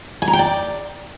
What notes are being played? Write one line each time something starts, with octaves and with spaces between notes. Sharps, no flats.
G#5
A#5
G5
D5